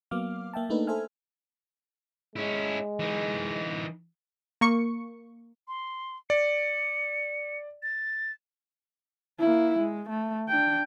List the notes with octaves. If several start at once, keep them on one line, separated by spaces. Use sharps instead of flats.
F#3 A#3 B3 F5 D6 F6
A#3 E5 G5 A5
A3 A#3 D4 D#4 A4 B4
A4 C5 E5 G#5 F6
G#3 C#4 E4
E3 D#4
A#3 C#6 C#7
C6
D5 C#7
A6
A#3 E4
G#3
A3
D4 G5